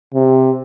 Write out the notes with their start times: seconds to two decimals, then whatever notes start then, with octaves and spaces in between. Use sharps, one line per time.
0.14 C3